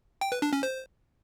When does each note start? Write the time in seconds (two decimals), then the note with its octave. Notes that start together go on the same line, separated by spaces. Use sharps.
0.21 G5
0.32 B4
0.42 D4
0.53 C#4
0.63 C5